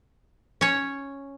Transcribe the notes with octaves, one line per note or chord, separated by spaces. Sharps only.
C#4 C#5